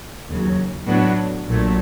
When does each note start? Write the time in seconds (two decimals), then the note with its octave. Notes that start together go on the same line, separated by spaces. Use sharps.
0.28 D#2 C#3 F#3
0.87 A2 F#3 B3 D4 F#4
1.48 A#1 A#2 F#3 A3